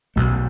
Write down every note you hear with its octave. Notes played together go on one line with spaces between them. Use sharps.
B1 B2 A3